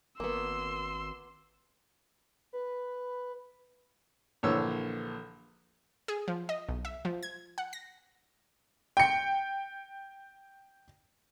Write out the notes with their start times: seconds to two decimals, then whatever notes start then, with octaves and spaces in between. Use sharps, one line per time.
0.20 G#1 A#3 B3 C6 E6
2.53 B4
4.43 A#1 D3 E3 C#5 E6
6.08 G#4
6.28 F3
6.49 D#5
6.69 B1
6.85 E5
7.05 F3
7.23 G#6
7.58 F#5
7.73 A#6
8.97 G5 C#7